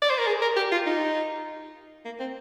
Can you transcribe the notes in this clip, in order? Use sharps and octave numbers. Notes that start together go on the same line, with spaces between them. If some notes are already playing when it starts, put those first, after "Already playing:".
D5
C5
A#4
G#4
A#4
G4
F4
D#4
A#3
C4